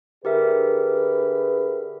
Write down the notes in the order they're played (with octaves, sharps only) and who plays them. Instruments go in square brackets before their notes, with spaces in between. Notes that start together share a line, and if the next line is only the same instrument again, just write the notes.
[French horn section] D3 G#4 B4 [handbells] G4 A#4 E5